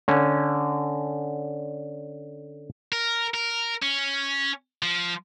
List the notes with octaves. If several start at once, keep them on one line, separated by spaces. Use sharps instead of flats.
D3 C#4
A#4
A#4
C#4
F3